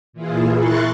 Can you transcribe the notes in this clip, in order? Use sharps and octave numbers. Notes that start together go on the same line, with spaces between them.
A#2 E3 E4 F4 G#4
E4 A#4 C6 C#6 F#6 A6